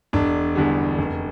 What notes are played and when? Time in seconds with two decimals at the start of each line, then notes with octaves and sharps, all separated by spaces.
0.13 E1 D4
0.55 E2 D3 G3
0.98 F1